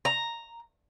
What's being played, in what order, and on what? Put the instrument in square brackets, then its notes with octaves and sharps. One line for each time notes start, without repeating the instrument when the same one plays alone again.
[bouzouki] A#5